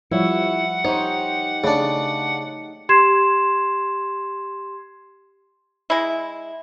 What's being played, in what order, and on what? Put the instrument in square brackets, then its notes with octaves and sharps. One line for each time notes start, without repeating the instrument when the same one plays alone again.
[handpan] F3 G3 C#5 [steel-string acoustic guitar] E4 [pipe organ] F#5
[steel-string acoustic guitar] D#4 G4 [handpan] C5 [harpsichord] C#5
[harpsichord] C#3 D4 [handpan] A3
[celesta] G4 C6 G#6 C7 E7
[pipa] G#3 E4